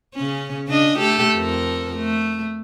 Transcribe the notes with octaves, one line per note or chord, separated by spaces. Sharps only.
C#3 C#4
C#3 D4 D#5
A3 G4 A4
F2 A4 A#4
A3